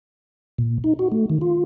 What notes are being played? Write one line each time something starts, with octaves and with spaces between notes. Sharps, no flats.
A#2
D#4
F#4
A3
D#3
F4